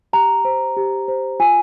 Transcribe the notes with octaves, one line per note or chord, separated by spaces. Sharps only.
G4 A#5
C5
G4
C5
F4 G#5